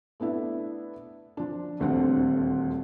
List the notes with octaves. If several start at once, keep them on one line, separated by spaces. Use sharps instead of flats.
A3 B3 D4 E4
F3 D4
D#1 D2 D3 C4 F#5